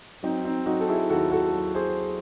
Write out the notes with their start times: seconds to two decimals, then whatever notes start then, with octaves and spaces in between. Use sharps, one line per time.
0.23 F#3 C4 D#4
0.45 C4 D#4
0.66 F#3 D#4 F#4
0.80 A4
0.88 E4 G#4
1.09 D#2 F#4 A4
1.31 F#4 A4
1.53 F#3
1.75 G#4 C5